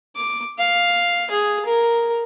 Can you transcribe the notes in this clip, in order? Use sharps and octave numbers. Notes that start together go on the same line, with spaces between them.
D6
F5
G#4
A#4